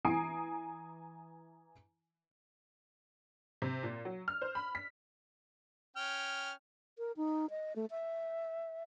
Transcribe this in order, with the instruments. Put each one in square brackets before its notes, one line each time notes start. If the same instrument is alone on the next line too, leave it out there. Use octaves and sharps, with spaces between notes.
[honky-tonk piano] E3 G#5 A#5 D#6 C7 D7
C3
A#2
F#3
F6
C5
B5
B6
[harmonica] C#4 G5 F6
[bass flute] A#4
D#4
D#5
A3
E5